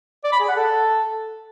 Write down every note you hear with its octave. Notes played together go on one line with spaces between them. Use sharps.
D5
B5
G#4
F#5
A4